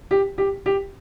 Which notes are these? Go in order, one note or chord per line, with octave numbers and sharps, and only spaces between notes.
G4
G4
G4